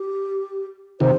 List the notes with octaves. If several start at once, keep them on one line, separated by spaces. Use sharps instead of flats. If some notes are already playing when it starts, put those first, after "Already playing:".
Already playing: G4
C3 D#3 C5